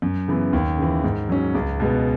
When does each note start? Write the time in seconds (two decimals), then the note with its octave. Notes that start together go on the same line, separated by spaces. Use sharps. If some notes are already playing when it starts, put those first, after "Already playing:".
0.02 F#2
0.28 C#3 E3 B3
0.53 D#2
0.78 C#3 E3
1.04 G#2
1.29 F#3 C#4
1.54 C#2
1.80 B2 G#3 B3